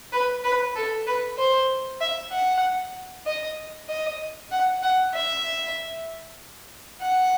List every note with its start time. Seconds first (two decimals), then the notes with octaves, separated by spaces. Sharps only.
0.13 B4
0.44 B4
0.76 A4
1.07 B4
1.37 C5
2.01 E5
2.32 F#5
3.26 D#5
3.89 D#5
4.52 F#5
4.82 F#5
5.14 E5
7.02 F#5